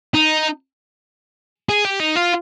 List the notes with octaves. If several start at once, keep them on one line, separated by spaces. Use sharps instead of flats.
D#4
G#4
G4
D#4
F4